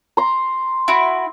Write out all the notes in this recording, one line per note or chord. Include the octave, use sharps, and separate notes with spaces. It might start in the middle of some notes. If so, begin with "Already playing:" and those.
A#5 C6
E4 F#4